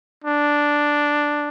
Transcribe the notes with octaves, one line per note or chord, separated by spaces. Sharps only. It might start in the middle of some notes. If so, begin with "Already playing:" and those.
D4